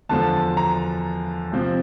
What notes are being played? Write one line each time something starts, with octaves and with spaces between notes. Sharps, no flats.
E2 D3 F3 A5
A#5
C3 F3 C4